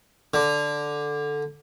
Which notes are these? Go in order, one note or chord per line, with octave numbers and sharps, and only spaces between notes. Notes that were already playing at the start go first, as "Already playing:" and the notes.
D3